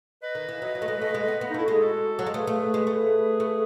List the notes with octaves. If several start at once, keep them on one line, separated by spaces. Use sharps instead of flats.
B4 D#5
D#3
E3
F#3
F#3
A3
G#3
A3
G#3
B3
B3
D#4
A3 E4
G#3 F#4
G#4
F#4 A4
F#3
G#3
A3 G#4 B4
A3
G#3
A3
A3